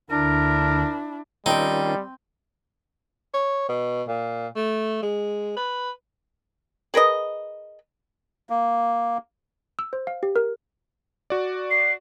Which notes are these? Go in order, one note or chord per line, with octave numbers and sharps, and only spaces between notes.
D2 D3 D4 E4 A#4
D#3 G3 C4 C#4 D#4 F4 G5
C#5
B2
A#2
A3
G#3
B4
G#4 A#4 B4 D#5
A#3
E6
C5
F5
G4
A#4
F#4 D5
C7